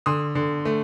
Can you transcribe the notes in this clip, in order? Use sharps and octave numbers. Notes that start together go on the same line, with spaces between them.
D3 C6 D#6
D3
A3